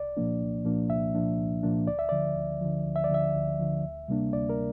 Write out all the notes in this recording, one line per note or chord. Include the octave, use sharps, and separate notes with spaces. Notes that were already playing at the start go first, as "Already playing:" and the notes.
Already playing: C2 D5
A#2 F3 A#3 D4
C2
A#2 F3 A#3 D4
C2 E5
A#2 F3 A#3 D4
C2
A#2 F3 A#3 D4
D2 D5
E5
D3 F3 D5
D2
D3 F3
D2
E5
D5
D3 F3 E5
D2
D3 F3
D2
C3 G3 A#3 D4
D2 D5
A#4